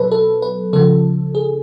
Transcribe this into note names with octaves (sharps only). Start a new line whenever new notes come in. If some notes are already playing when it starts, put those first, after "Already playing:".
Already playing: B2 F#3 A4 B4
A4
B4
C#3 F3 A4
G#4